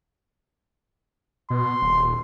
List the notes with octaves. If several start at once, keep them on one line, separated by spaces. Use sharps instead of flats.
B2 C6
D#1